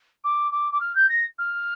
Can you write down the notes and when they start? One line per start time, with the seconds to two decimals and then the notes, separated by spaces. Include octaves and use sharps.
0.24 D6
0.52 D6
0.72 D6
0.80 F6
0.95 G6
1.09 A#6
1.39 F6